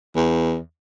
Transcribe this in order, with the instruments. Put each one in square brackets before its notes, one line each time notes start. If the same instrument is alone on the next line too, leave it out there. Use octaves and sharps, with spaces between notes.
[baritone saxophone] E2